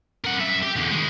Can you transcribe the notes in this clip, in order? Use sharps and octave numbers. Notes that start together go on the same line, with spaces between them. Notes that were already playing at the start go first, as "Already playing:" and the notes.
A#4 F#5
F#2 E5
G4
E2 D3
D#3 G#3